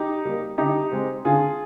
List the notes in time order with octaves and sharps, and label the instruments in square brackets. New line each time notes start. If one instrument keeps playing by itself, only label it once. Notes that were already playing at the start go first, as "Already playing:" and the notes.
Already playing: [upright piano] D#4 G4
G3 A#3
D3 D#4 G4
G#3 C4
D3 F4 G#4